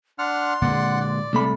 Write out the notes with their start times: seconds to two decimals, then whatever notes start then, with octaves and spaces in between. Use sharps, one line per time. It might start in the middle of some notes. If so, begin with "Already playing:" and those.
0.19 D4 F#5 C6 F6
0.62 A#2 D3 G#3 D5 F#5
1.01 D5
1.33 C2 A3 B5